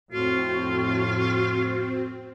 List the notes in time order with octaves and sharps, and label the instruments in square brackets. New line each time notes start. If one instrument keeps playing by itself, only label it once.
[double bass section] F2 A2 [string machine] C4 [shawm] F4 [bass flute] F#4